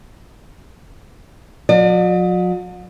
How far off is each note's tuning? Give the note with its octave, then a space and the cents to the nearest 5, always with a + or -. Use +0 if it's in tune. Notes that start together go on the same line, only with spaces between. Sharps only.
F#3 -45 D5 +45